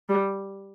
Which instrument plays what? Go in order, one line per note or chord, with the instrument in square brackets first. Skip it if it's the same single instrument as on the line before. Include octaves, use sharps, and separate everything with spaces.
[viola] G3